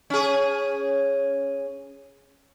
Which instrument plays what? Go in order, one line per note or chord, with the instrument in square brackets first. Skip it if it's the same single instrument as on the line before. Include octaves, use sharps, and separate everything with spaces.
[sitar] C#4 G#4